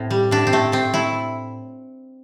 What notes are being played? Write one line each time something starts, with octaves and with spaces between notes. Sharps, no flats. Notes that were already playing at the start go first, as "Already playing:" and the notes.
Already playing: A2 C4
G3
A2 D4
C4
A2 A3
A3 C4
A3 E4